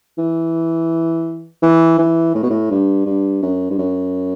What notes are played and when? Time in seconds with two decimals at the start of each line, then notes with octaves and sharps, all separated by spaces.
0.18 E3
1.62 E3
1.98 E3
2.35 A2
2.43 B2
2.50 A2
2.71 G2
3.06 G2
3.43 F#2
3.70 G2
3.78 F#2